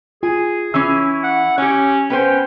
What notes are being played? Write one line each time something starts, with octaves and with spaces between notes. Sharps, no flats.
F4 G#4 G#5
E3 C#4 E4 E6
F#5
C#4 G4 C#5
B3 C#4 B4 C5 G5